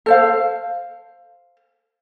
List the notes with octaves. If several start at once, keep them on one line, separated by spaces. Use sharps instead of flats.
A4 C5 F5